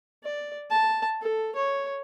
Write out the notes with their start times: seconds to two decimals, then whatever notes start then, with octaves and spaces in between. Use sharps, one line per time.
0.24 D5
0.70 A5
1.22 A4
1.55 C#5